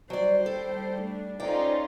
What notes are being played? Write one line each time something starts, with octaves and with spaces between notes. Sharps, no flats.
F#3 G3 C5 D5 G5
A4
A3 D4
C#4 D#4 F4 A4 C5 D5 G5